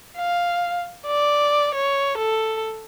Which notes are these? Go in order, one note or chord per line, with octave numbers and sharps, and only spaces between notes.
F5
D5
C#5
A4